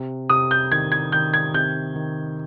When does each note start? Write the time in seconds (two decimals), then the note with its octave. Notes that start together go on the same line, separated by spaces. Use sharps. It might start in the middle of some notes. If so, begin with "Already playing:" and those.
Already playing: C3
0.29 C3 D#6
0.51 G6
0.72 D#3 G#6
0.92 G#6
1.12 D#3 G6
1.34 G#6
1.54 C3 G6
1.96 D#3